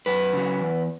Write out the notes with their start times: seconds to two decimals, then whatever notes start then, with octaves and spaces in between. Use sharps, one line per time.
0.06 F#2 B4
0.33 C#3 F#3
0.61 E2